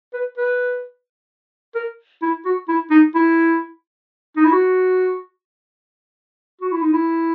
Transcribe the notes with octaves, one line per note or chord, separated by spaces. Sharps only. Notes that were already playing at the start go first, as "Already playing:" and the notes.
B4
B4
A#4
E4
F#4
E4
D#4
E4
D#4
E4
F#4
F#4
E4
D#4
E4